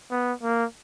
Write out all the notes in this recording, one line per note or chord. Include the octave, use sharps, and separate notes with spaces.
B3
A#3